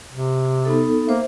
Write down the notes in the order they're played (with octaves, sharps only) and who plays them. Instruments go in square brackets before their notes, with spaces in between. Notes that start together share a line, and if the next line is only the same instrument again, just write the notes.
[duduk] C3
[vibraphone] B3 D#4 A4
[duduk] A#3 [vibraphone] C5 E5